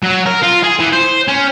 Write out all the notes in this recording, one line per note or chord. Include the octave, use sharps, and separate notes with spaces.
F#3
A#4
F4
G#4
E3
C5
C#4